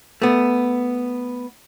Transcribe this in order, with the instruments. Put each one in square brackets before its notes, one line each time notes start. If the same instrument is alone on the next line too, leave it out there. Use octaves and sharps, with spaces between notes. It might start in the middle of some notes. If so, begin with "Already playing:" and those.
[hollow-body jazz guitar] A3 B3